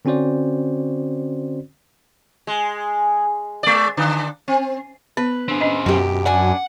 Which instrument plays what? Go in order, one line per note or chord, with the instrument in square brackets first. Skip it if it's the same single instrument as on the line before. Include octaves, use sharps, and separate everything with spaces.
[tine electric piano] D3 C4 C#4 F#4 C5 D5
[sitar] G#3
G#3 D5
D3 D4
C4
[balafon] B3 [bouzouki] B4
[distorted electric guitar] C4 G#4 [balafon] D4
[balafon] C#4 D#5
[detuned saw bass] F#2 [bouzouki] B2 G4
[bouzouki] D4 G#5 [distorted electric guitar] F#5